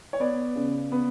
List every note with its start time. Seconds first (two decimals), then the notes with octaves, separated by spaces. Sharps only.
0.13 C#5
0.20 B3 D5
0.56 C#3
0.92 B3